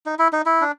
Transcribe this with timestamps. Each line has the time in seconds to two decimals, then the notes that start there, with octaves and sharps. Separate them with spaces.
0.06 D#4
0.19 E4
0.33 D#4
0.46 E4
0.61 D4